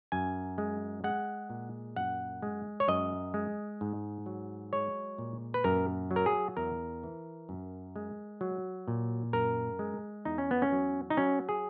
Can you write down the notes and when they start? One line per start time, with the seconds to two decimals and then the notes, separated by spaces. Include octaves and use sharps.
0.12 F#2 G#5
0.58 G#3
1.04 G#3 F#5
1.50 A#2
1.96 F#2 F#5
2.42 G#3
2.80 C#5
2.88 F#2 D#5
3.34 G#3
3.81 G#2
4.26 F#3
4.73 G#3 C#5
5.18 A#2
5.54 B4
5.64 F#2 A#4
6.11 F#3
6.16 A#4
6.26 G#4
6.57 E2 A#4
7.03 E3
7.49 F#2
7.96 G#3
8.41 F#3
8.88 A#2
9.33 F#2 A#4
9.79 G#3
10.25 E2 D#4
10.38 C#4
10.51 B3
10.62 C#4
10.72 F#3
11.10 D#4
11.17 F#3 C#4
11.49 G#4